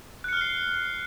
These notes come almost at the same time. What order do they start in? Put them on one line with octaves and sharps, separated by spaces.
F#6 C#7 F6 G7 C7